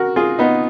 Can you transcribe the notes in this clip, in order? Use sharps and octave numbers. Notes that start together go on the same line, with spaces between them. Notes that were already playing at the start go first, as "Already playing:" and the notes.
Already playing: F#4 A#4
F4 G#4
B3 D#4